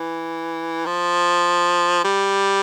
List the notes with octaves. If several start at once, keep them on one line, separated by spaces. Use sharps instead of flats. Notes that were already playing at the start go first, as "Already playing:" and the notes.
Already playing: E3
F3
G3